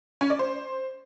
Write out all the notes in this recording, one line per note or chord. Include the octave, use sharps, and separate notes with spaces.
C#4
D5
C5